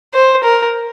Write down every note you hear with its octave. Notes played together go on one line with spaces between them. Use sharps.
C5
A#4